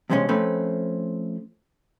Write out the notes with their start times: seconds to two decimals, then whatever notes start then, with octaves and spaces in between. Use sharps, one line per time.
0.10 E2 G2 C3 G#3 C#4
0.29 F3 A3 C4 C#4 B4